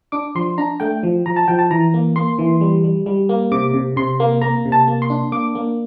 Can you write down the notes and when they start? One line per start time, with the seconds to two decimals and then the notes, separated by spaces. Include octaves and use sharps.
0.12 D4 D6
0.35 F3 C6
0.58 D4 A#5
0.80 A3 G5
1.03 F3
1.26 F3 A#5
1.36 A5
1.48 F3 G5
1.59 A5
1.70 E3 A#5
1.94 A#3
2.16 A#3 C6
2.38 E3
2.61 G3
2.84 G3
3.06 G3
3.29 A#3
3.51 C3 D6
3.74 C3
3.96 C3 C6
4.20 A#3
4.42 A#3 A#5
4.65 C3
4.72 A5
4.87 A#3
5.02 C6
5.10 D4
5.32 A#3 D6
5.55 A#3